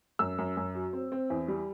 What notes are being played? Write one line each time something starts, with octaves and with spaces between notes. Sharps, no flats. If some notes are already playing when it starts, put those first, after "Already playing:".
F#2 E6
F#2
F#2
F#3
C4
C4
E2
G3